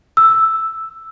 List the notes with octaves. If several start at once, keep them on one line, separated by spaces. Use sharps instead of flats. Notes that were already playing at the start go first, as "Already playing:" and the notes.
E6